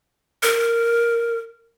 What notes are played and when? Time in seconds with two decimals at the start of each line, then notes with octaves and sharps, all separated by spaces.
0.43 A#4